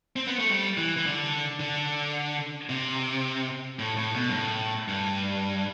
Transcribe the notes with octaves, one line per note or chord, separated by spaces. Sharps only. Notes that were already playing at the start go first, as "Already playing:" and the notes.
C4
B3
A3
G3
E3
E3
D3
D3
C3
A2
A2
B2
G2
A2
G2